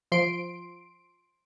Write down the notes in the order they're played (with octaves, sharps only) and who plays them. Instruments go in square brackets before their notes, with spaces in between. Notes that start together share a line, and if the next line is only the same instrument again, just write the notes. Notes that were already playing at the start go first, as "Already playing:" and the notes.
[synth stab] F3 C6 D7